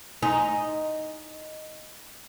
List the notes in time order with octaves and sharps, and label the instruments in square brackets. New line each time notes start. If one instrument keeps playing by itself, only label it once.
[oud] D#4 [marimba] G#5 C6